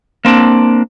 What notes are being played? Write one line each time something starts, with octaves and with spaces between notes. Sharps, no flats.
A#3 C4 D4